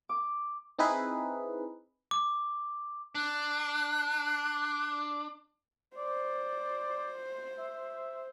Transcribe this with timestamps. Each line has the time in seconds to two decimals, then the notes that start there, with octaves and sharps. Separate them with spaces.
0.09 D6
0.79 C4 D#4 E4 G#4 B4
2.11 D6
3.15 D4 F#6
5.97 C5 D5
7.58 E5